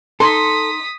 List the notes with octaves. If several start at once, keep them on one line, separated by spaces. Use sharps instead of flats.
D#4 A4 C6 D#6 B6